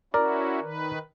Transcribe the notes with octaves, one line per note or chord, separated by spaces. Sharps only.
C#4 E4 F#4 A#4 D5
D#3 B4